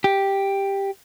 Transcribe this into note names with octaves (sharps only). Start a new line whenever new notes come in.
G4